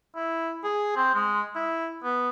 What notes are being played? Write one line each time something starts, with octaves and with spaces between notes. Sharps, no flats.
E4
G#4
C4
G#3
E4
B3